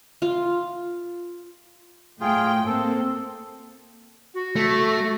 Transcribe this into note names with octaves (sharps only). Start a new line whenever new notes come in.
F4
A2 F4 G#4 G5
A#3 C4 A4
F#4
A3